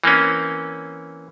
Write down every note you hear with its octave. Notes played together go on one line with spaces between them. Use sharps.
E3 A#3 C4 C#4